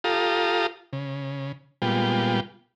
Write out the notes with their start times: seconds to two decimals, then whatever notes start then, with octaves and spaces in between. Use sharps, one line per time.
0.04 F4 G4 A4 F5 A#5 D#6
0.93 C#3
1.82 A#2 G3 G#3 B3 F4 G5